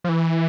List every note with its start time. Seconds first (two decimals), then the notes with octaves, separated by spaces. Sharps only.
0.04 F3
0.09 E3